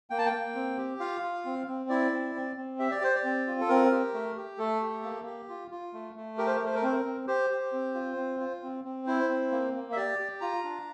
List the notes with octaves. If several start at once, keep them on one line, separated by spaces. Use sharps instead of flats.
A#3 G5
A5
G5
A#3
C4
G4
F4 F5
F4
C4
C4
E4 D5
C4
C4
C4
G4 E5
D5
G4 C5
D5
C4
F4
A4
C4 A#4
G4
A3
G4
A3 A4
G4
A#3
G4
F4
F4
A3
A3
G4 A#4
C5
A#4
A3
C5
A#4
C4 C5
A#4
C4
G4 C5
G4
C4
F4
C4
F4
C4
C4
E4 C5
C4
A#3
A#3
E5
G4 D5
G4
F4 A#5
D4